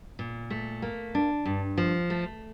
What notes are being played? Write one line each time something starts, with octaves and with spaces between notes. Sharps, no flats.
A#2
A3
A#3
D4
G2
F3
A3